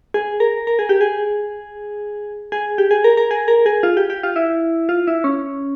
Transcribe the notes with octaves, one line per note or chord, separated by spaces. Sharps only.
G#4
A#4
A#4
G#4
G4
G#4
G#4
G4
G#4
A#4
A#4
G#4
A#4
G#4
F4
G4
G4
F4
E4
F4
E4
C#4